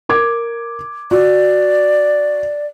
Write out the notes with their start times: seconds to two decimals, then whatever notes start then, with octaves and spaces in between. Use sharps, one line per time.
0.09 A#4 D6 G#6
1.11 F#4 D5